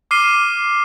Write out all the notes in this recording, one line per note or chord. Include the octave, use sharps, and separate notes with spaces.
D6 F6 C7 D#7 G7